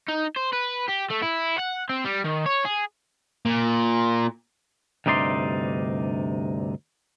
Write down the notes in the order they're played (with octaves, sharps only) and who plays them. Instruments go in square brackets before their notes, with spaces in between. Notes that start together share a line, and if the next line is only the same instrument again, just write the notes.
[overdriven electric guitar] D#4
C5
B4
G4
A3
E4
F#5
C4
G3
D#3
C#5
G#4
[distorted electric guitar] A#2
[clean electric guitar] D2 G2 C3 D#4 D5 C6